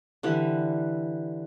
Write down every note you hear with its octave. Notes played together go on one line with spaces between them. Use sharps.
D3 E3 G3